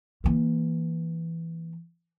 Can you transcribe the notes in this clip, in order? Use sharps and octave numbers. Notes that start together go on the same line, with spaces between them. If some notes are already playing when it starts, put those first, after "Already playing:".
E3 A#3